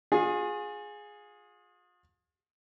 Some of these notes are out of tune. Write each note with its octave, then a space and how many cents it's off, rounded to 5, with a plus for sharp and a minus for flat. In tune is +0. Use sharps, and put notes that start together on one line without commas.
F4 +40 G#4 +0